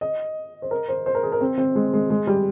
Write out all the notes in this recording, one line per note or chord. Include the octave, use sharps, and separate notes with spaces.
D#5
C5
A#4
C5
C5
A#4
G#4
A#4
C4
C4
G#3
G#3
G#3
G3